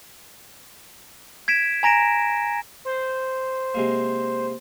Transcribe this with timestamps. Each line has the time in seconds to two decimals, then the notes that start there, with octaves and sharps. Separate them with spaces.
1.48 G#6 B6 D7 E7
1.83 G#5 A#5 A#6 D7 E7
2.85 C5
3.75 C3 G#3 A#3